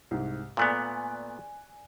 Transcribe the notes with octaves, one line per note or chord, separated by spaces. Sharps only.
C2 G#2
A#2 A3 B3 D5 G#5 F#6